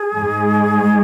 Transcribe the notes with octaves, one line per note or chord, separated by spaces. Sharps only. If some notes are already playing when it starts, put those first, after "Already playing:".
Already playing: G#4
G#2